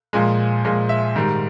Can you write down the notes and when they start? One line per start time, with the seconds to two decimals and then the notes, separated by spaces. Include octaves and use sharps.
0.13 A#2 F3 G#3
0.64 A#2 F3 G#3
0.89 E5
1.16 G#2 D#3 G3